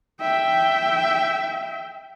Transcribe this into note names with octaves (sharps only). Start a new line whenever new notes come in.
E5 G5